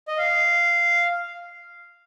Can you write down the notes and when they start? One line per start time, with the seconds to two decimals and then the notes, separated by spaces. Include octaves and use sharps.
0.08 D#5
0.18 F5